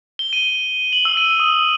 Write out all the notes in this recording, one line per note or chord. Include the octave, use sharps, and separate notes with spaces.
G7
D#7
F#7
E6
D#7
D#6